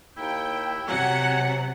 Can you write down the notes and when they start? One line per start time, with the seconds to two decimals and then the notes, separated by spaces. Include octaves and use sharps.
0.17 D#2 E4 G5
0.88 C3 F#3 F#5 G#5